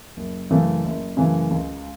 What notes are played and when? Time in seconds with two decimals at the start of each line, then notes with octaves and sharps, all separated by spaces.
0.17 F#1
0.50 F#2 C#3 E3 A3
0.84 F#1
1.17 F#2 C#3 E3 A3
1.51 C#2